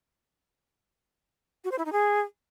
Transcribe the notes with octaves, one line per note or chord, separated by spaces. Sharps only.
F#4
C5
E4
D#4
G#4